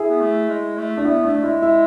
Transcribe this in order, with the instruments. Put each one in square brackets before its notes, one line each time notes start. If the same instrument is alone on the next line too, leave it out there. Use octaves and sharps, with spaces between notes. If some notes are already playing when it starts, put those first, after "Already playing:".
Already playing: [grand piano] E4 G#4
[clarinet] B3
A3
G#3
A3
[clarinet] A3 [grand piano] D4
[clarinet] B3 [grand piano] E4
[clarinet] A3 [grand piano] D4
[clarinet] G#3 [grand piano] E4
[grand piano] E4